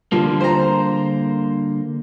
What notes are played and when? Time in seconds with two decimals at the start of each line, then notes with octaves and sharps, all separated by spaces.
0.12 D3 F3 G3 A#3
0.40 C5 A#5